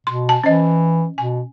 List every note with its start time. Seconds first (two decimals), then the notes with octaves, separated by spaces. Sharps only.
0.07 B2 C6
0.29 G#5 A5
0.44 E3 C#4 C5 D#5
1.18 B2 G#5